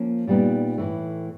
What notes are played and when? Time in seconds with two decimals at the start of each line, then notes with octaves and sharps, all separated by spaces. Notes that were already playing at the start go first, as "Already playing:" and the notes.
Already playing: F3 A#3 C#4
0.27 A#2 G3 B3 D#4
0.78 A2 E3 A3